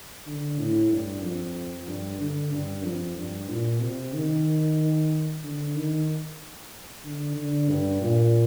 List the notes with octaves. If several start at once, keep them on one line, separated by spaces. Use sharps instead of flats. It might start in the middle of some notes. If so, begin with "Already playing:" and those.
D3
A2
G2
F2
G2
D3
G2
F2
G2
A#2
C3
D#3
D3
D#3
D3
D3
G2
A#2